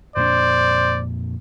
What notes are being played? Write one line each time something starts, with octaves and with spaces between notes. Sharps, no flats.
F2 A#2 D4 C5 D5